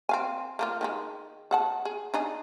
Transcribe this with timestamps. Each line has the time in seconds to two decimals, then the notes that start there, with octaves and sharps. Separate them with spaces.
0.09 C4 F5 G#5
0.59 A3 A#3 F4
0.81 D#3 F3 G#3
1.51 G#4 F#5 A5
1.85 G#4
2.14 D4 D#4 G#4